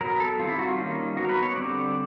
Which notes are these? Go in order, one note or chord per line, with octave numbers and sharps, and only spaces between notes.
F#3 B3 A#4
A4
D#3 G3 C4 F4
E4
F#4
F4
D#3 G3 A#3 C#4
F#3 B3 F#4
A#4
B4
C#5
D3 G3 C4 D5